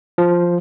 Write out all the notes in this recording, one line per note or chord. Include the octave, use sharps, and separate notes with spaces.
F3